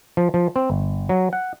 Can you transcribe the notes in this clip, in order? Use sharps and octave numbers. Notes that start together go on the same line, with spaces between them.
F3
F3
C4
G1
F#3
F#5